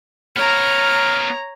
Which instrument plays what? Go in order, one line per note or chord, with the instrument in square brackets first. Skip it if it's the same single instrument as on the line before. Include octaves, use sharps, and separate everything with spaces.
[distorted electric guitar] B3 A#4 [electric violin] C#5 A#5 [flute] F6